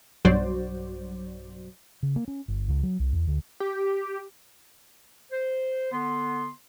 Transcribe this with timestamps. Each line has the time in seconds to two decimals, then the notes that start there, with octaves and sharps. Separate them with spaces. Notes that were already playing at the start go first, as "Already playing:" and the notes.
0.25 B1 G2 F#3 F#4 C5 D5
2.03 C#3
2.16 A#3
2.28 C#4
2.48 G1
2.68 C#2
2.83 F#3
2.99 C2
3.13 E2
3.27 D2
3.60 G4
5.32 C5
5.92 D3 B3 C6